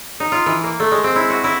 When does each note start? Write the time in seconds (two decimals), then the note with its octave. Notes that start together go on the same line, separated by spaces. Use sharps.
0.20 D#4
0.32 F4
0.46 E3
0.64 A#3
0.80 A3
0.92 G#3
1.04 C4
1.16 E4
1.30 F#4
1.44 E4